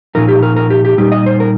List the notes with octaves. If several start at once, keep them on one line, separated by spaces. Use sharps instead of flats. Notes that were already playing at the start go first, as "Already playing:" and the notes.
A#2 F3 D#4 A#4
G4
A#4
A#4
G4
G4
A#2 G3 D#4 G4
D#5
C5
A#4